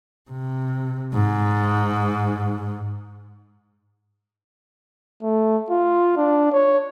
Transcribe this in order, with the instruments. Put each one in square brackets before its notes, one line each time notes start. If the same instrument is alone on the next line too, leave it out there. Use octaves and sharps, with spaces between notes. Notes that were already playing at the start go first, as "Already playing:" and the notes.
[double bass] C3
G#2
[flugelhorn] A3
F4
D4
C#5